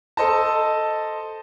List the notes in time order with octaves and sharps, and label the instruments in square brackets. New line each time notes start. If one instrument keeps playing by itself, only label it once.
[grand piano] A4 C5 D#5 A5